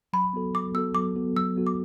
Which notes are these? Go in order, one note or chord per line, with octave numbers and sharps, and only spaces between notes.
F#3 B5
B3 F#4 A4
F#3 D6
B3 F#4 A4 E6
F#3 D6
B3 F#4 A4
F#3 E6
B3 F#4 A4
D6